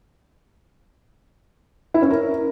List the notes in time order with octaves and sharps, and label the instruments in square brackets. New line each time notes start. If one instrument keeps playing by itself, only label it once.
[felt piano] E4
C#4
A#4